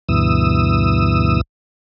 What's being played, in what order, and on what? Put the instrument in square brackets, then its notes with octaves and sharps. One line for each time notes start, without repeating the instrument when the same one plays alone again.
[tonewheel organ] D2 G2 B2 E3 D#6 E6